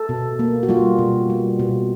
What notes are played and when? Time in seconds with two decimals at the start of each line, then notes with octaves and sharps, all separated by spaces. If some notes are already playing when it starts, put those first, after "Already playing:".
Already playing: A4
0.09 B2
0.39 A#3
0.63 F#4
0.69 G3 F4
0.99 B2
1.30 G3
1.59 B2